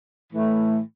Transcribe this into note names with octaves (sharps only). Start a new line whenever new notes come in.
A2 E3 A3